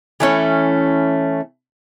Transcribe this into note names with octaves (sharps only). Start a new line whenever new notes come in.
E3 A3 C#4